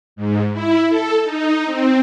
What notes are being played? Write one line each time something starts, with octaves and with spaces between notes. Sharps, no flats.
G#2
E4
A4
D#4
C4